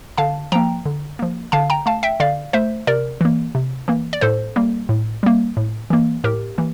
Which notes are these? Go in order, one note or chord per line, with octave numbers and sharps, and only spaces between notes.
D3 F5 A5
F3 A#3 G5 A#5
D3
F3 A#3
D3 F5 A5
G5 A#5
A3 F5 A5
E5 G5
D3 D5 F5
A3 C5 E5
C3 A#4 D5
E3 A#3
C3
E3 A#3
D5
A2 A4 C5
G3 A#3
A2
G3 A#3
A2
E3 A#3
A2 G4 A#4
E3 A#3